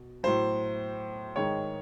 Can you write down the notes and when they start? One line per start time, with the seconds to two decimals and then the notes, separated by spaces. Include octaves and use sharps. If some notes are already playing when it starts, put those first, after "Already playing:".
Already playing: B2
0.23 A2 F#3 C5
1.36 G#2 D#3 G#3 C#5